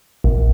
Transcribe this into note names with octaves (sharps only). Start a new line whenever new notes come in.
A#1